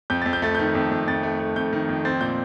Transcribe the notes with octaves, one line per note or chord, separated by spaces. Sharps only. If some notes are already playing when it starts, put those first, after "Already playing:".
F2 G6
F2 A6
G6
A3 A6
D#3 G6
F2
F2
F2 A6
A3
A3
F2 G6
D#3
F2
C4 A6
A#2 G6